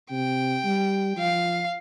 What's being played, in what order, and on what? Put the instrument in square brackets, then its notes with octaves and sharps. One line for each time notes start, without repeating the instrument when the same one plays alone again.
[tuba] C3 [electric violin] G5
[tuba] G3
[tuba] F3 [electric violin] F5